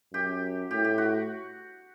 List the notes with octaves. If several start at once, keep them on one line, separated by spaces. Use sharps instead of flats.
F#2 G4
A2 G4
G4
F#4